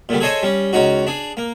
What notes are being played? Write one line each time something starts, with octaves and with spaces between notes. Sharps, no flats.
A#2 D3 G3
G#4 A4 C5 C#5 D#5 G#5
G3 C#4
C#2 C#4 D#4 F#4
D4 G#4
A#3